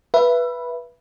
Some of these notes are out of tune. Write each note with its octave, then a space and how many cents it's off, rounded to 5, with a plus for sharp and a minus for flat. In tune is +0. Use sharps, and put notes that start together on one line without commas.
B4 -10 E5 +25